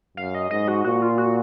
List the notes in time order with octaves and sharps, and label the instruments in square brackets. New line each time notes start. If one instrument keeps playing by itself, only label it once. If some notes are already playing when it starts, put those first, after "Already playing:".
[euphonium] F#2 [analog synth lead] F5
[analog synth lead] D#5
[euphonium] G#2 [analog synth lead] D#5
[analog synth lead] F#4
[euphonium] A#2 [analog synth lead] F#4
[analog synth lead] F4
F#4